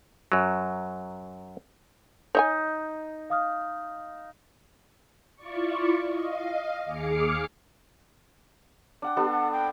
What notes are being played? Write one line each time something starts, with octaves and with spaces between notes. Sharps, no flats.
F#2 F#3
D#4 C#5 E5 G#5
F5 D#6 F6
E4 F4 D5 C#6
D#5 F5
D#2 G#4 D6 F6 C7 C#7
D4 F#5 G5
B3 D4 G4 A4
F#5
G5